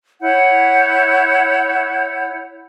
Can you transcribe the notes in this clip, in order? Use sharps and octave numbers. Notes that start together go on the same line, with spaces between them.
E4 C#5 F#5 G6